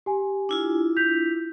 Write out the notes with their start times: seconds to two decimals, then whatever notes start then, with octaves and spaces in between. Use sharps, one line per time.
0.06 G4 G#5
0.49 D4 E4 F4
0.97 G6 B6 F7